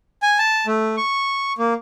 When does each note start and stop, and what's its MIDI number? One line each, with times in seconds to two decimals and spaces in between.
0.23 0.38 80
0.39 0.66 81
0.67 0.96 57
0.97 1.53 85
1.58 1.74 58